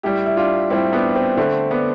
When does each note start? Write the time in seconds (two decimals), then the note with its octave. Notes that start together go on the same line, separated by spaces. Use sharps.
0.03 A2 G3 E4 G4
0.26 E4
0.37 D4 F4
0.70 A2 G3 C4 E4
0.93 B3 D4
1.15 C4
1.37 D3 A3 C4
1.71 B3 D4